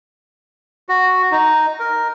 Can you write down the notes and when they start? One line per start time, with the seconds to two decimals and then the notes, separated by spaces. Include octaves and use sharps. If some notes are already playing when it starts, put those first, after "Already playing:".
0.89 F#4
1.31 D#4
1.80 A#4